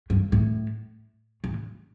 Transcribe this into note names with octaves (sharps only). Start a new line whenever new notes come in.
G2
A2
A2